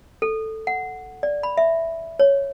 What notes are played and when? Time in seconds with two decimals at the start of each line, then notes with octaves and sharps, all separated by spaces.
0.22 A4
0.67 F#5
1.23 D5
1.43 B5
1.57 E5
2.19 C#5